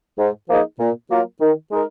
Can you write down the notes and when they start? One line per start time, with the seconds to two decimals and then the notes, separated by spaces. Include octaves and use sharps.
0.18 G#2
0.48 F3 A#3 D#4 G#4
0.79 A#2
1.10 F#3 A#3 F4 A#4
1.41 D#3
1.71 G#3 D#4 A#4